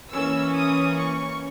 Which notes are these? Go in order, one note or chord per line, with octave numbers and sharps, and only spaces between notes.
E3 A#3 C#4 E6
D#6
C#6